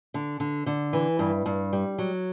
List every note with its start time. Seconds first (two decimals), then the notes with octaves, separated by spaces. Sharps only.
0.14 D3
0.40 D3
0.66 D3
0.93 E3
1.19 G2
1.46 G2
1.73 G3
1.98 F#3